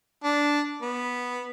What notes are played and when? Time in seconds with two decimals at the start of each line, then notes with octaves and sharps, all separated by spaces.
0.24 D4
0.82 B3